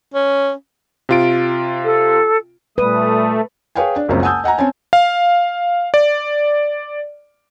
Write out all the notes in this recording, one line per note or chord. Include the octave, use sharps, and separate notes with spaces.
C#4
C3 F4 D7
A4
A#2 G3 A3 B4 D#6
G#4 B4 C#5 F5 G5 G#5
D4
F#1 C#2 F#2 F3 C4 C5
F#5 G#5 A5 D#6 E6 G6
D#5 F#5 G#5 A#5
C4 C#4 C#5 G#5 A5
F5
D5